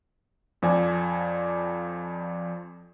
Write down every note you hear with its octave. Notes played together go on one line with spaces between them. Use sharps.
F2 F3 D5 G#5